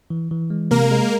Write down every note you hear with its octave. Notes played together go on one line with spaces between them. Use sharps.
E3
E3
G#3
C3 A#3 A#4
G#3